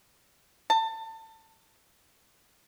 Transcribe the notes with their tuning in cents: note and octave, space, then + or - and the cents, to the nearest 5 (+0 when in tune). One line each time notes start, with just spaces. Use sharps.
A5 +25